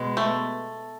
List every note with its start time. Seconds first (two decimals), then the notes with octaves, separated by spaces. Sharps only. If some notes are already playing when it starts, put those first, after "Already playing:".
Already playing: B2 G#3 B3
0.17 A3